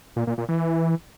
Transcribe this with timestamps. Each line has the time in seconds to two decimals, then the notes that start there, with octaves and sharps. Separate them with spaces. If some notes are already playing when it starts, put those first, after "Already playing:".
0.16 A#2
0.27 A#2
0.38 A#2
0.49 E3